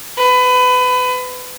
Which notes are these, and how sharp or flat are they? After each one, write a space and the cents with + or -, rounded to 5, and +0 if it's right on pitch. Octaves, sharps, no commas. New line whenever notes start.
B4 +25